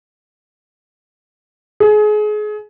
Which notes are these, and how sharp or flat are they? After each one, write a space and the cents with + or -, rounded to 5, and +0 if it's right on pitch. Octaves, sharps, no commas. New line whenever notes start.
G#4 +30